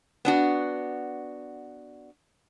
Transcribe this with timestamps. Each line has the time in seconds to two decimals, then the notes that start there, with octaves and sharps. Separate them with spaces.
0.25 B3 D4 F#4